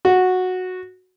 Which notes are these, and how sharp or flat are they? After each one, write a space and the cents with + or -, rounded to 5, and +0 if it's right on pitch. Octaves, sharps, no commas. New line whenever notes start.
F#4 -10